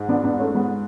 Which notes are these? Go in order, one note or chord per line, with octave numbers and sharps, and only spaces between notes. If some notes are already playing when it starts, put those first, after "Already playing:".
Already playing: G#2
B3 D4
B3 D4
A3 C#4
G#3 B3